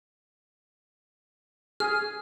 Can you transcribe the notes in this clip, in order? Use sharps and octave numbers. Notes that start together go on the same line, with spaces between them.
G#4 F6